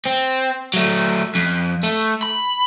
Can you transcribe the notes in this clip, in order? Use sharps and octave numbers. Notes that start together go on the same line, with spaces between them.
C4
F#3 A3
F2
A3
B5